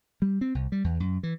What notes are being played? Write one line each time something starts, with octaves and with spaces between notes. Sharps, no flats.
G3
C4
C2
G3
E2
F#2
E3